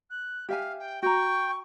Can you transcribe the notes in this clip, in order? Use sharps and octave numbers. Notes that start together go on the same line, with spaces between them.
F#6
G4 E5 F5 G#5
G5
F#4 G5 A#5 C#6